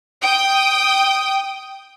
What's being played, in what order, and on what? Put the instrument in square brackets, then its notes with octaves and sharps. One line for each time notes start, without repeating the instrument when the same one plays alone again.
[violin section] G5 D#6